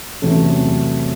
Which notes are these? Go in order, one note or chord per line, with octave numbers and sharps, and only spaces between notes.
E2 C3 F#3 A3 C#4